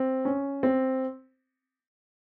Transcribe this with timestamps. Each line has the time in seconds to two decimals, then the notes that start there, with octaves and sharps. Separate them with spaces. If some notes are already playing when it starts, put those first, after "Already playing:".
Already playing: C4
0.25 C#4
0.63 C4